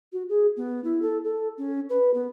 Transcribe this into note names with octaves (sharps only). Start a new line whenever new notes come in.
F#4
G#4
B3
E4
A4
A4
C#4
B4
B3